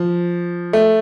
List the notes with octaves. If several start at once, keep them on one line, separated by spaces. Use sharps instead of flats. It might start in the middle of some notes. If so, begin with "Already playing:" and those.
Already playing: F3
A3